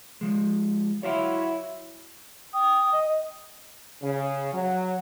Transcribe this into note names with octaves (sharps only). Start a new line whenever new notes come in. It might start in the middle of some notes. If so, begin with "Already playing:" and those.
F3 G#3
F#3 E4 C#5 F5 C6
G5 D#6
D#5
C#3
F#3